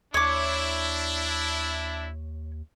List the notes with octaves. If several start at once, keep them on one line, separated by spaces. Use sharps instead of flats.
D#2 D4 E4 C#5 D6